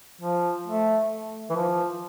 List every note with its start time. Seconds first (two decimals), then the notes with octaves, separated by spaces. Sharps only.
0.21 F3
0.66 A3
1.50 E3
1.56 F3